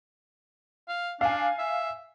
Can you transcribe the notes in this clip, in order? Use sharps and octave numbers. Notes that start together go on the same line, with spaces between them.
F5
D4 F5 G#5
E5